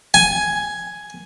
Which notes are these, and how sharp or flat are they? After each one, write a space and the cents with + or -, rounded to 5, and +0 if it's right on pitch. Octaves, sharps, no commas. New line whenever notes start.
G#5 +5